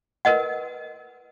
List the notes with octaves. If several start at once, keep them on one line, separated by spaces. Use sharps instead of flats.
A#4 B4 D#5 F#5